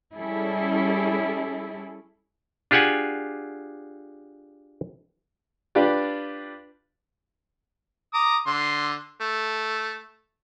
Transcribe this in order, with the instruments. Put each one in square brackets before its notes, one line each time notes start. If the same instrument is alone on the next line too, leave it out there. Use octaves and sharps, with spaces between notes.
[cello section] G3 C#4 E4 G#4 A4
[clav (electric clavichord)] D4 F4 G4 G#4 F#5 G#5
[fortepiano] D4 F4 G4 B4 D5
[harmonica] A#5 D6 D#6
D3 C6
A3